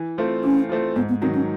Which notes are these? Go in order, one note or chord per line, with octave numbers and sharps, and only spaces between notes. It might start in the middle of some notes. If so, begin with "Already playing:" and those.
Already playing: E3
A3 C4 F4
E3 C#4
A3 C4 F4
G#2 B3
B3
D#3 F#3 C4
C#4